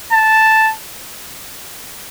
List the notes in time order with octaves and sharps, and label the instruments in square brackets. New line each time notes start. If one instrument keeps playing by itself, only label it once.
[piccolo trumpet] A5